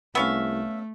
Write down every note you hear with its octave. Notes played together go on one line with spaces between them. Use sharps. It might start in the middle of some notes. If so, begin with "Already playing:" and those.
C2 A3 B3 C#4 E5 F5